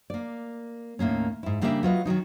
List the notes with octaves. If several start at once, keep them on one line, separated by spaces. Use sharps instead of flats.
A#3 D5
D#2 A2 A#3 C#4
G#2 E4
C#3 G3 A#3 D4 E4 E5
F#3 F4 B4 D#5
D#3 F3 F#3 D#4